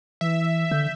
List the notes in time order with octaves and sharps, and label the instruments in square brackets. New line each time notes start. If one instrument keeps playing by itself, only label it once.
[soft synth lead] E3 [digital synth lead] E5
[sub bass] D3 [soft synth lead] G6